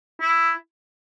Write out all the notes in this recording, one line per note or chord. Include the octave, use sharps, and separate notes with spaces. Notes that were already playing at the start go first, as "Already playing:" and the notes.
E4